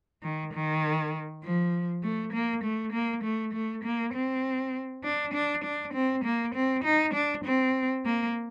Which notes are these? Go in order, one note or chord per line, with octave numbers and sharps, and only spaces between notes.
D#3
D#3
F3
A3
A#3
A3
A#3
A3
A3
A#3
C4
D4
D4
D4
C4
A#3
C4
D#4
D4
C4
A#3